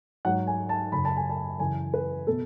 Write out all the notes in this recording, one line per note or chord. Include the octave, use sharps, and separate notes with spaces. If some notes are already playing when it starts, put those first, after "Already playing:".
G#2 F#3 F#5
G#5
A5
F#2 C#3 F#3 B5
A5
G#5
A5
F#2 C#3 E3 G#5
B4
B2 A4